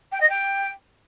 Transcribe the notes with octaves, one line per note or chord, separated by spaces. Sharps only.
G5
D#5
G5